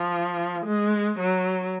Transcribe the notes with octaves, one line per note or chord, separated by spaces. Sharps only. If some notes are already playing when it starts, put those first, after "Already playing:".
Already playing: F3
G#3
F#3